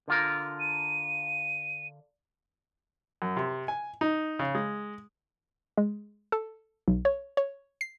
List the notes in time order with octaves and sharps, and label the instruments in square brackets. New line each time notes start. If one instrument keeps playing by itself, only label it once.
[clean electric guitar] D3 F4 A#4
[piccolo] D#7
[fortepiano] F#2
C3
G#5
D#4
C#3
G#3
[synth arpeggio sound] G#3
A4
B1
C#5
C#5
C7